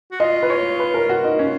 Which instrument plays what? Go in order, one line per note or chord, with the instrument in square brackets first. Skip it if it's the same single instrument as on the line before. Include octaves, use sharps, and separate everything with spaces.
[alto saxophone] F#4
[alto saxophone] F4 [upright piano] D#5
[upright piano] B4
C#5
B4
A#4
F#4
D#4
[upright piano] C#4 [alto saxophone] F4